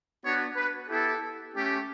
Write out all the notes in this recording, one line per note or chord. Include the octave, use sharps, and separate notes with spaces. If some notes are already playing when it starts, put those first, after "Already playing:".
B3 D4 F#4 C#5
B4
B3 E4 G4 A4
A3 C#4 G4